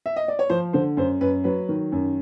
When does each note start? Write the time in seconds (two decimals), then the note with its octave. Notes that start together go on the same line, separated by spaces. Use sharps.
0.06 E5
0.16 D#5
0.28 D5
0.39 C#5
0.50 F3 C5
0.73 D3 C5
0.97 F#2 C5
1.21 F#2 B4
1.44 F#3 B4
1.69 D#3
1.92 F#2